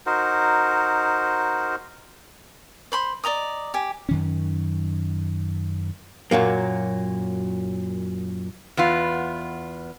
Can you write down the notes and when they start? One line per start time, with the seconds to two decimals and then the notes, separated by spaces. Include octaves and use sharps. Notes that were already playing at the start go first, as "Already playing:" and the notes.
0.06 D#4 F#4 A#4 C5
2.92 C5 B5 C6
3.24 D5 D#5 A#5 D#6
3.74 G4 G#5
4.09 F#2 D#3 C#4
6.31 F#2 A#2 F#3 A#3
8.77 E2 B3 F4